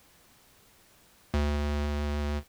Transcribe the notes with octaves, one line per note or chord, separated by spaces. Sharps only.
D2